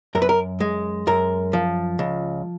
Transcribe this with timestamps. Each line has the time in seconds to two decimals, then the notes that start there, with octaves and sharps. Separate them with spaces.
0.15 F#2 A#4
0.22 B4
0.29 A#4
0.60 G#3
1.07 F#2 A#4
1.53 F3
1.99 C#2